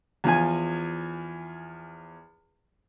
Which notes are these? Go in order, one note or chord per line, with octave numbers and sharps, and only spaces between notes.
E2 F3 G#5